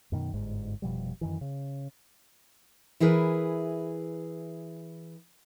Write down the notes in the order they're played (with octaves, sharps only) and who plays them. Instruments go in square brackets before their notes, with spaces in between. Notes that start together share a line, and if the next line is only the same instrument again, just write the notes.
[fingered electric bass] F#2 B2 D#3
G1 G#2
F1 B2 F3 G3
F#2 D#3 E3
C#3
[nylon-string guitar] E3 E4 G#4 A#4 B4